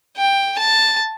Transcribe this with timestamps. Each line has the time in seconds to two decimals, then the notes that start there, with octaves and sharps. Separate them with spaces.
0.17 G5
0.58 A5